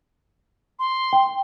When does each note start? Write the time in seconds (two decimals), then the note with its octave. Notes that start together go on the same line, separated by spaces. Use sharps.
0.79 C6
1.13 G5